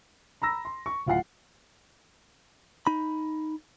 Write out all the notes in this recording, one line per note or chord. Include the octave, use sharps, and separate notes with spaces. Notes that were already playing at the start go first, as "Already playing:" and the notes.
A#5 B5 E6 A#6
C6
C#6
D1 F4 F5 F#5 C7
D#4 B5